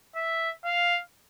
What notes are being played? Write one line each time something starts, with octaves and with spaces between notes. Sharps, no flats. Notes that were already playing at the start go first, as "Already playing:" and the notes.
E5
F5